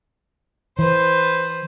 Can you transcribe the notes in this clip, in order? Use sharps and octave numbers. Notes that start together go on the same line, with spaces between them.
E3 B4 C5